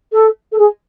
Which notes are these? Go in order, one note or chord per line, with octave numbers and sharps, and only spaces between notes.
A4
A4
G#4